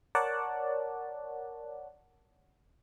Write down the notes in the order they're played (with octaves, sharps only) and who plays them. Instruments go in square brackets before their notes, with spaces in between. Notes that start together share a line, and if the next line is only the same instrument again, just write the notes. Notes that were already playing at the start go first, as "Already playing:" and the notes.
[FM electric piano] A#4 C#5 D5 F#5 A5